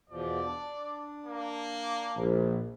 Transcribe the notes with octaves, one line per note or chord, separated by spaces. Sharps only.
E2 B2 F3 D5
D4
A#3
A#1